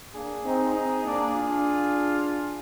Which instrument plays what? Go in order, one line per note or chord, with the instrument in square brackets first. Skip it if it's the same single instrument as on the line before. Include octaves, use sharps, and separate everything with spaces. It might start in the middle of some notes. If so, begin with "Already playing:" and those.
[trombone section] A#3 D4 [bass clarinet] G#4
[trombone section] C4 D#4
C4 D#4
A#3 D4
D4 F4